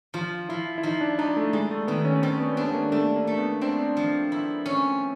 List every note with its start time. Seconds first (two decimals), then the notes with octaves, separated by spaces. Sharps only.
0.14 F3 F4
0.49 F3 E4
0.78 E4
0.83 F3 D#4
1.01 D4
1.19 D4 D#4
1.37 A3
1.53 G3 G#3
1.71 A3
1.88 D#3 B3
2.05 C#4
2.22 G3 C4
2.40 B3
2.57 B3 D4
2.70 B3
2.75 A#3
2.92 A3 D4
3.16 A#3
3.27 A3
3.38 B3
3.61 C4 D4
3.97 F3
4.32 E4
4.66 C#4